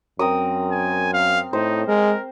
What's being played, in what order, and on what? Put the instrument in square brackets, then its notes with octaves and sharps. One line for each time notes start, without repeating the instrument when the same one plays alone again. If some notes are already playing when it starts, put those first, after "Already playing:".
[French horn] F#2 [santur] C4 A#4 D#6
[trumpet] G#5
F5
[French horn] A2 [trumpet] D#4 [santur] C5
[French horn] G#3 [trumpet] A#4